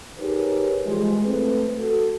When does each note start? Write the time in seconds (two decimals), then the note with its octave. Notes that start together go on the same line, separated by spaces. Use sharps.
0.18 D#4 G4 G#4 A#4 B4 C#5
0.86 E3 F3 G3 G#3
1.23 A3 C4 B4
1.79 F#4 A4